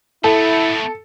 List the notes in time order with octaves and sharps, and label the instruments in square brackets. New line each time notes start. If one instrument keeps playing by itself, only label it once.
[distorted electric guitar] A3 B3 [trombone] E4 [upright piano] A4